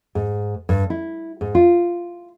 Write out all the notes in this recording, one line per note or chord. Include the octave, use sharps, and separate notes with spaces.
G#2
G2
E4
G#2
F4